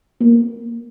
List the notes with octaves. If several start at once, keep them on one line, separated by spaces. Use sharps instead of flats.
A#3